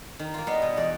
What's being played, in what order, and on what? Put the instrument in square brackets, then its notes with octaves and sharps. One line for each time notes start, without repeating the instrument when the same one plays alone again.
[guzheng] D#3
A#3 F4
[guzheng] G3 B3 F5 [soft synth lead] D#5
[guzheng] B2
E2 D5